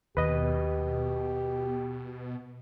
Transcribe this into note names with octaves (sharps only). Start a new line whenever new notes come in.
D#2 B2 G4 B4 D#5